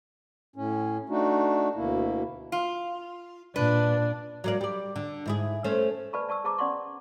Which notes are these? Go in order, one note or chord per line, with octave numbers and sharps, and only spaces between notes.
A2 C#4
A3 D4 D#4 F#4
D2 B2 A#3 E4
F4
A#2 D4 B4
F#3 A#3 D5
G3 D5
D3
G#2 E4 G#4
A3 C#4 C5
B4 D5 G#5 A5 B5 C#6
D5 A5 C#6 E6
G#4 C5 A5 A#5 D6
C#4 D5 F#5 C6 C#6